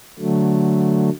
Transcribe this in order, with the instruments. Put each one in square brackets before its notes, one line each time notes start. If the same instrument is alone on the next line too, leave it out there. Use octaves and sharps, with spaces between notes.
[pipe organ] D3 F#3 A3